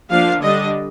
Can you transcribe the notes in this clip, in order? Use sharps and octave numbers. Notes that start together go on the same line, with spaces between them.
F3 A#3 D4 F5
D3 G3 D4 D#5